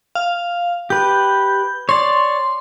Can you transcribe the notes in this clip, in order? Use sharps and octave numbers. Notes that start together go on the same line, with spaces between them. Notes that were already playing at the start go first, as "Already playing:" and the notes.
F5
G4 B4 G6
C#5 D5 C6